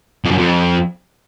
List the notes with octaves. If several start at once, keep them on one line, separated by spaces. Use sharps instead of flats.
F2
F#2
F2